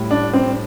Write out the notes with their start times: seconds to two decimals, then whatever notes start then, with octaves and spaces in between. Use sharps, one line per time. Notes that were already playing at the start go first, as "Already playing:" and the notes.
Already playing: A2 G3
0.11 D4
0.34 C4